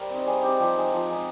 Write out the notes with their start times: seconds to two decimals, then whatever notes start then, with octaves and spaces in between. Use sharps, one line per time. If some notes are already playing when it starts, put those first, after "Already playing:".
Already playing: G3 A#4 C5
0.10 C4 D#4
0.26 G3 G#4
0.43 C4 D#4 G4
0.59 F3 G4
0.76 G#3 D#4
0.92 F3
1.09 G#3 D#4